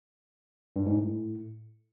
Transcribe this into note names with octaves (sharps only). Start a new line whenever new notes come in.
G2
G#2
A2